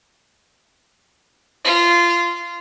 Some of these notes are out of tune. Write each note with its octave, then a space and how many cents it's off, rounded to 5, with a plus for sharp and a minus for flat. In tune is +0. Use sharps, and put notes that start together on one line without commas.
F4 -20